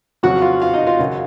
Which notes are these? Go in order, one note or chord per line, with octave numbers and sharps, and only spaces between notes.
F2 C#3 F#3 F#4 F#5
F4 F5
F4 F5
D#4 D#5
F4 F5
F#2 C#3 F#3